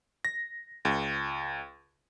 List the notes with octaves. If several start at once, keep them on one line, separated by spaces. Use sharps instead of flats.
A#6
C#2